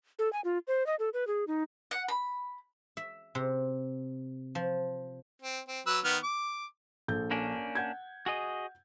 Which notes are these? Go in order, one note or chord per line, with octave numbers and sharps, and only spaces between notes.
A4
G#5
F4
C5
D#5
A4
B4
G#4
D#4
F#5
B5
E5
C3
F3
C4
C4
F#3 B4 E6
D#3 B3 F6
D6
A#1 A4 G6
A#3 C#4 D4
F#5 G6 G#6
F#4 G#4 D#5